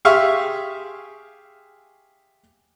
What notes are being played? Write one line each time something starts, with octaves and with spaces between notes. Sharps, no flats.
G4 G#4 E5 F5 C6 C#6